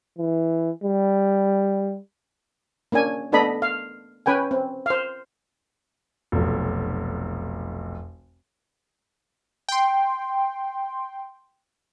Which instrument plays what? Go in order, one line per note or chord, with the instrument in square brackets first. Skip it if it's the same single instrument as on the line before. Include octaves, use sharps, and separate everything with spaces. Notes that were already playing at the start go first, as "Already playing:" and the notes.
[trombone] E3
G3
[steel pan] A#3 C#4 D4 G#5
A3 B3 D4 A4 D#5 B5
F5
C#4 B4 G5 G#5
C4
C5 F5
[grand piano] F1 B1
[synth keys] G5 C6